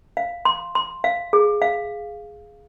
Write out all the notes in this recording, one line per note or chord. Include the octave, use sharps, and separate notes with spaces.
F5
C6
C6
F5
G#4
F5